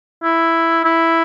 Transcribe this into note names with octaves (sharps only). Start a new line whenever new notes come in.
E4
E4